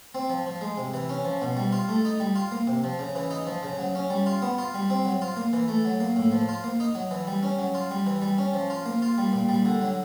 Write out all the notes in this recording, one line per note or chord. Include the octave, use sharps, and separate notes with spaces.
C4
F3
F3
G#3
C3
E3
C#4
F3
B2
G3
F4
A3
D#4
G3
F4
A#3
C3
F3
C#3
E3
D#4
F3
C#3
F#3
C#4
G3
F4
B3
F4
G3
C4
F#3
F4
A#3
E3
A3
F#3
A#3
A2
F3
F4
A#3
D#4
F#3
E3
G3
C#4
F#3
F4
G3
E3
G3
C#4
F3
F4
A#3
F4
G3
A#2
G3
D3
F#3